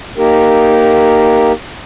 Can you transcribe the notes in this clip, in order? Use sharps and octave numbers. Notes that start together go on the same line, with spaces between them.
A#3 D#4 G4 A#4